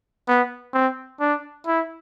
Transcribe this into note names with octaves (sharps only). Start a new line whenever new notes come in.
B3
C4
D4
E4